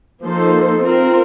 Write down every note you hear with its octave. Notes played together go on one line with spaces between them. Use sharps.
F3 A#3 D#4 A4 C5
C4 F4 A#4